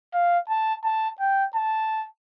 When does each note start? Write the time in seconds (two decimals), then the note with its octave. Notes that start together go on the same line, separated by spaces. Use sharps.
0.14 F5
0.50 A5
0.85 A5
1.20 G5
1.55 A5